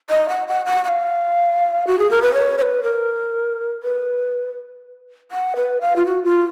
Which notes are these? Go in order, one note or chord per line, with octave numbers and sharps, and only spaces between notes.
D#5
F#5
F#5
F#5
F#5
F5
F#4
G#4
A#4
B4
C#5
C#5
B4
A#4
B4
F#5
B4
F5
F4
F#4
F4